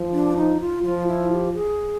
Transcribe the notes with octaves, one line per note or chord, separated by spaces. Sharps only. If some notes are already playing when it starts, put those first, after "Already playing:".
Already playing: F3
D4
D#4
F4
F3 F4
E4
G4
G#4